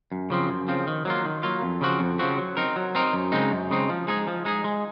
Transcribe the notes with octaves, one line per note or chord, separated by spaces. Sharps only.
F#2
C#3 F3 C4
F#2
C#3 F3 C4
D#3
F#3 A#3 F4
D#3
F#3 A#3 F4
F2
C#3 F3 C4 F#4
F2
C#3 F3 C4 F#4
F#3
C4 D#4 A#4
F#3
C4 D#4 A#4
F#2
C#3 G#3 C4 D#4
F#2
C#3 G#3 C4 D#4
F3
G#3 D#4 G#4
F3
G#3 D#4 G#4
G#3